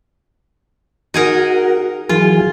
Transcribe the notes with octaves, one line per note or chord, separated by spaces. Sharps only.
D#4 F#4 G#4 A#4
E3 F#3 F4 G#4